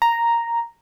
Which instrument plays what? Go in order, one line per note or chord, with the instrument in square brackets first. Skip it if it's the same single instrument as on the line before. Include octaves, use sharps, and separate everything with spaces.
[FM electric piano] A#5